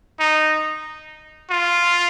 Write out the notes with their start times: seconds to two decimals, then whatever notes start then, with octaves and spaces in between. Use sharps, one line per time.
0.20 D#4
1.50 F4